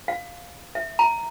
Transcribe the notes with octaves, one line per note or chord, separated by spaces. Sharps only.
F5
E5
A#5